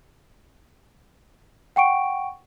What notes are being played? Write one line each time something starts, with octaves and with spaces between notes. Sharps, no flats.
F#5 G5 C#6 D7